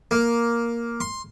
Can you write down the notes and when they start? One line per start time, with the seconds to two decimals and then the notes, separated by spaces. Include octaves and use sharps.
0.11 A#3
1.01 C6